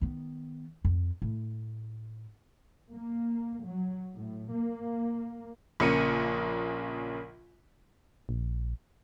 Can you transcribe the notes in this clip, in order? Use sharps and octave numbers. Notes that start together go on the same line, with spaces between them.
D#3 B3
F2
A2
A#3
F#3
A2
A#3
A#1 C#3 A#3 C#7 D#7
A#1